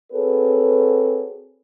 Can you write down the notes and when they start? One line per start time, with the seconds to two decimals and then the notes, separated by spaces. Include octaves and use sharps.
0.13 C4 F#4 G#4 A4 B4 C#5